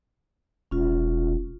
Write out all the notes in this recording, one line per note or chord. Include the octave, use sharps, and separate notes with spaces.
E1 C#4 F4